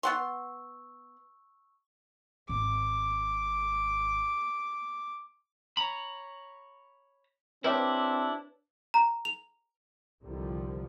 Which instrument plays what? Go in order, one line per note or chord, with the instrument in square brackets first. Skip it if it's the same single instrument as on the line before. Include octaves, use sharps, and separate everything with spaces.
[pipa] B3 F#5 C6 [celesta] C#6 E6
[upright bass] G#1 [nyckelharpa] D6
[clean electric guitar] C#5 A#5 B5
[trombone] C4 [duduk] D4 [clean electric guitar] E4 G4 [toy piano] B4 C#5 D#5
[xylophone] A#5
F7
[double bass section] C2 D3 D#3 F3 G3